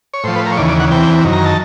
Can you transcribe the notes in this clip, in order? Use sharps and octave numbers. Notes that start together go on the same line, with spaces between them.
C#5
A2 F3 C5
B4
A#4
C#5
D#2 C#3 E3 D5
D5
F#5
E2 C3 E3 G5
F#2 D#3
A#5
A5